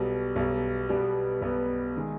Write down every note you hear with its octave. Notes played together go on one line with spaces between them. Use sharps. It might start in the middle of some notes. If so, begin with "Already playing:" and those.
Already playing: B1 B2 G3
B1 B2 G3
B1 B2 G3 B3
B1 B2 G3 B3
D#3 G#3